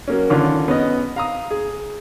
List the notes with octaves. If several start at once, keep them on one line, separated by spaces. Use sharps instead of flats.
F#3 A#3 C#4
D3 D#3 C#4 D4 F4
B3 C#4 D#5
F5 A#5 D#6
G#4